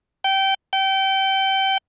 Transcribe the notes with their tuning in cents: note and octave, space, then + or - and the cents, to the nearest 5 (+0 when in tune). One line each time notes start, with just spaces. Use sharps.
G5 -20
G5 -25